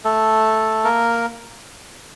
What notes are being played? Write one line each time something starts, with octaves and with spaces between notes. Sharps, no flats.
A3 A4
A#3 A#4